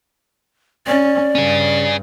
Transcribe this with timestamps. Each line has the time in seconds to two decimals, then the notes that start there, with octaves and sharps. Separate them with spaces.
0.87 C#4 D5
1.35 G2 C#4 G#4